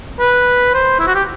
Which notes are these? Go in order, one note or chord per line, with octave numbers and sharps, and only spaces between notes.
B4
C5
E4
F#4
G4